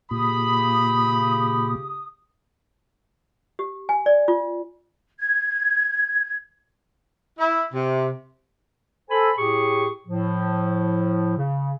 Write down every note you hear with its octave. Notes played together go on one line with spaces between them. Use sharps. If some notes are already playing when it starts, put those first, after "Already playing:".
A#2 C#3 G4 B5 D#6
G4
G#5
D5
F4
G#6
E4
C3
A4 C5 G#5 B5
A2 G4 G#4 C#6
A2 F3
C#3